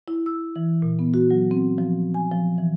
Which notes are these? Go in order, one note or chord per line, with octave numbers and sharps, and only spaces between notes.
E4
E6
E3
A#2
B3
F#4
F#3
C4
F3
G#5
F3
E3